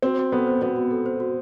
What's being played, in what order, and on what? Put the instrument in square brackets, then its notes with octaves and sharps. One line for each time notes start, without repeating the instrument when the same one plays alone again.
[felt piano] C4 [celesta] F#4
[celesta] F#4
[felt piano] B3 [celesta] A4
[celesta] C5
[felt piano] B3 [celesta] F#4
[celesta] F#4
A4
C5
F#4